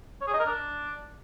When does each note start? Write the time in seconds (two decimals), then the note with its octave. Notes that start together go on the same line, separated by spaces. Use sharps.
0.21 C#5
0.27 G#4
0.34 D#5
0.40 A#4
0.46 D4